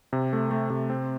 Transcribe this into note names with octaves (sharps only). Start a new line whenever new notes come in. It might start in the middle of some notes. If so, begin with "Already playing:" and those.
C3
A3
A3
C3
C4